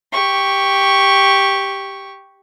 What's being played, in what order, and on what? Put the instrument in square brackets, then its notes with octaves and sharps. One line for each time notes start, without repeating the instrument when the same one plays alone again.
[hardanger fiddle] G4 C#6